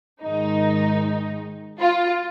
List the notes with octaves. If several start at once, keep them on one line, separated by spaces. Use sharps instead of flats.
G#2 D#3 G#3 D#4
F4